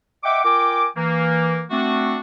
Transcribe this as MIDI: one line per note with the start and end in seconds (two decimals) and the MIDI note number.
0.24 0.44 75
0.24 0.44 76
0.24 0.44 78
0.24 0.44 79
0.24 0.44 86
0.45 0.87 65
0.45 0.87 70
0.45 0.87 79
0.45 0.87 80
0.45 0.87 86
0.97 1.63 52
0.97 1.63 58
1.71 2.19 57
1.71 2.19 60
1.71 2.19 62
1.71 2.19 66